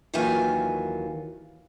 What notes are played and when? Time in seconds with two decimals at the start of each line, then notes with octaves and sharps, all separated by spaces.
0.14 D#2 D#3 E3 F#3 F4 G#5